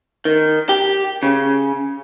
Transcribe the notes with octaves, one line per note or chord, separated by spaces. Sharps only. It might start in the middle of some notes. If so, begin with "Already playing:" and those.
D#3
G4
C#3